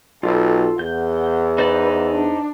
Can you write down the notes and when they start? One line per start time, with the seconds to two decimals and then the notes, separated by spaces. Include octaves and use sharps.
0.23 B1 F4 A4
0.79 E2 F#5 G6
1.58 D#4 B4 C5 D5
2.12 D4